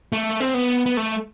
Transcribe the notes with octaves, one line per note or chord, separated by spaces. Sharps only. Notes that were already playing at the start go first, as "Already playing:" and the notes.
A3
C4
B3
B3
A3